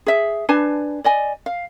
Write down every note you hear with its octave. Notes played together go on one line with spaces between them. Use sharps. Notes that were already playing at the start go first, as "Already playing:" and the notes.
G#4 E5
D4 B4 G#5 A5
D5 D#5 G#5
F5